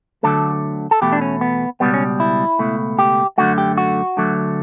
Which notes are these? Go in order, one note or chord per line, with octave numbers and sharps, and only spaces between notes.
D2 D3 F#3 A3 A4
A4
E2 B2 A3 G4
D4
C#4
B3
C#2 B2 G3 B3
C#4
E4
C#2 B2 A3
G4
F#2 D3 A3 F#4
G4
F#4
D2 D3 F#3 A3